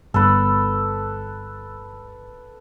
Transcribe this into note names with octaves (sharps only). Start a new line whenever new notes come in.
G1 A4 B4